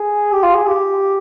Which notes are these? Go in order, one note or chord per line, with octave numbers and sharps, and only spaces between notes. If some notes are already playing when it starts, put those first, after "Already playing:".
Already playing: G#4
G4
F4
G#4
G4